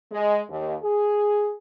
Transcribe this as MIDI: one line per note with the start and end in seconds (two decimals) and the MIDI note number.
0.11 0.39 56
0.49 0.75 39
0.82 1.52 68